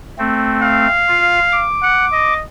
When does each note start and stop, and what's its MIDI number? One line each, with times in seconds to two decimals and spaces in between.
0.18 0.87 57
0.18 0.87 60
0.62 1.66 77
1.08 1.40 65
1.52 2.34 86
1.82 2.06 78
2.13 2.43 75